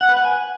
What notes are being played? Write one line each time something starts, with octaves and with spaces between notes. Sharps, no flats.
F#5
B4
F#5
G#5